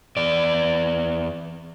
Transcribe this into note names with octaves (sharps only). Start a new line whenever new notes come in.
E2 D5